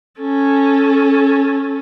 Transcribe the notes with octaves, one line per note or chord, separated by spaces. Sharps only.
C#4 A4